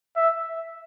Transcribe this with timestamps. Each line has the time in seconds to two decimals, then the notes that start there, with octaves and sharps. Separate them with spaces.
0.17 E5